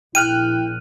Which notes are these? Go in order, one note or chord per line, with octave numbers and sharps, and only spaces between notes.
A#1 E4 G5 F6 F#6 D#7